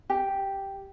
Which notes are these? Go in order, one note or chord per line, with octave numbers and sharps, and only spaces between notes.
G4